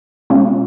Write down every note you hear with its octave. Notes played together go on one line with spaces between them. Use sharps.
B2 G#3 C#4 F4